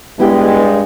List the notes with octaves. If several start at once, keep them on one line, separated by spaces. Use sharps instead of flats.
G2 G#3 B3 E4 G4